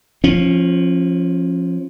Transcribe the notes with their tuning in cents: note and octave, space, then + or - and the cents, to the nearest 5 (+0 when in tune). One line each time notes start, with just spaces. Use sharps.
F3 +0 C#4 -30